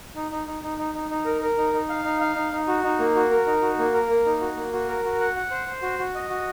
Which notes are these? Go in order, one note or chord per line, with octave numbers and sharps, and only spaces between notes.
D#4
D#4
D#4
D#4
D#4
D#4
D#4
A#4
A#4
D#4
D#4
F5
D#4
F5
D#4
D#4
F#4
D#4
A#3
F#4
A#4
D#4
F#4
A#3
A#4
A#3
D#4
F#4
A#3
F#4
A#4
F#4
F#5
F#5
C5
C5
F#4
F#4
D#5
F#4